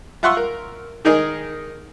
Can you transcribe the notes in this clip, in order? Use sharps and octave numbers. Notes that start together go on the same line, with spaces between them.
F4 E5 F#5 C6 C#6 E6
A#4
D#3 D#4 G#4 A#4 D#5